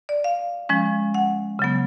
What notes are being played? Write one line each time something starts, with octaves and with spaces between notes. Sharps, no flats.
D5
F5
F3 G#3 C#4
F#5
C#3 F#3 B3